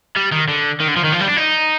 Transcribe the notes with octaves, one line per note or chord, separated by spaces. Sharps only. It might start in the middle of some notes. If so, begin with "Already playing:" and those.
G3
D#3
D3
D#3
D3
F3
D#3
F3
G3
D4
D#4